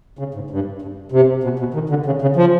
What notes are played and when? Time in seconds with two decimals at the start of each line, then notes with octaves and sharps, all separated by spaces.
0.19 C#3
0.34 G#2
0.50 G2
0.82 G2
1.12 C3
1.43 B2
1.59 B2
1.74 D#3
1.89 D3
2.06 C#3
2.22 C#3
2.36 F3